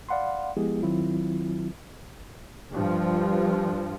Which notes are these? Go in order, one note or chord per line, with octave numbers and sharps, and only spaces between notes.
D5 F5 F#5 B5 C6
F3 G#3 B3 E4 G4 G#4
D#3 F#3 C4 E4 F4
G2 F3